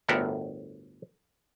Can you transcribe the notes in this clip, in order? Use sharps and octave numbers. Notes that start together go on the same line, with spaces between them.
G1 D2 A2 A#4 E5 F#5